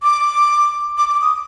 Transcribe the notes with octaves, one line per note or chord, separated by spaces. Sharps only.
D6
D6
D6
D#6